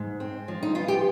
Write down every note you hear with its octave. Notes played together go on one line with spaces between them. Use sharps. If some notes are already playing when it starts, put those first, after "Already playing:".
Already playing: G#2
C4
F3
D#4
B3 F4
G4